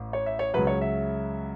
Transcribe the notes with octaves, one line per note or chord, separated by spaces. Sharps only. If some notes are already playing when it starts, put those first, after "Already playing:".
Already playing: A1 A2
C#5
E5
C#5
C#2 C#3 F#3 B4
C#5
E5